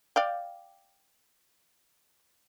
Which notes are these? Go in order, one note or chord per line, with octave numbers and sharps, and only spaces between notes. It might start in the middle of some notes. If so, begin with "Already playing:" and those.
D5 F5 G5